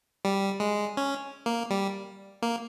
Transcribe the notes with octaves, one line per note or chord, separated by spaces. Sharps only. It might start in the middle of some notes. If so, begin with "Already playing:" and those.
G3
G#3
C#4
A#3
G3
A#3